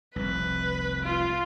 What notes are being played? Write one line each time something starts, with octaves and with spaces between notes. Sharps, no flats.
F1 C2 B4
F4